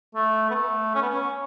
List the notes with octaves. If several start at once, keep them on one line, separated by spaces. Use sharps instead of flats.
A3
B3
A3
C#4
B3
C#4